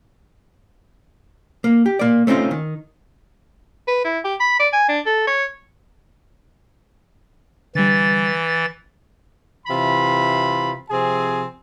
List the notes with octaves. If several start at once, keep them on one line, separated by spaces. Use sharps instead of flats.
A#3
G4
A#3 D5
A3 C4 C#4 D#4 F4
D#3
B4
E4
G4
B5
D5
G#5
D4
A4
C#5
D3 E3 G3 A6
C3 E3 F4 B5
C3 F3 C4 G#4 G#5